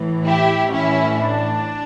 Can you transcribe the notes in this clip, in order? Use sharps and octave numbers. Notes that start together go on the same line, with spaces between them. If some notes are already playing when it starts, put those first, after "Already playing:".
Already playing: A2 E3
E4 G4
A2 E3 C#4 E4
D4